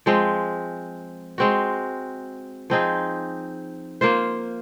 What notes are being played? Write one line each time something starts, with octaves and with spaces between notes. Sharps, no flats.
F3 G#3 C4
G#3 C4 F#4
F3 C4 D#4 G#4
A#3 F4 C5